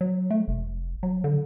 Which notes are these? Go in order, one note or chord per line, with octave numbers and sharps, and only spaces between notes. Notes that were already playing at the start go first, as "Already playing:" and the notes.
F#3
A3
F1
F#3
D3